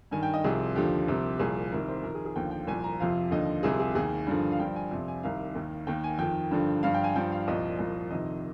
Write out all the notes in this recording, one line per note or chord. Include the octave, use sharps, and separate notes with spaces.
G2 D#3 G#5
G5
D#5
C2 C3 F3 G#4
D#2 D3 F3 G4
C2 C3 F3
C2 A#2 F3 G#4
C2 C3 D#3 A#4
C5
F2 D#3 A#4
G#4
G#4
D#2 D3 F3 G5
G5
C2 A#2 F3 G#5
A#5
F2 C3 F3 F5
D#2 D3 F3 D#5
C2 C3 F3 G#4
G#4
D#2 D#3 G#4
G2 D3 F3
F5
G2 F3 G5
G#5
F2 C3 F3
G#5
C2 C3 D#3 F5
D#2 D#3
D#2 D#3 G5
G#5
F2 D#3 G5
G2 D3 F3
G2 F3 F5
G5
G#5
G2 F3 G5
F5
C2 A#2 F3 D#5
C2 A#2 F3
F2 C3 D#3 D#5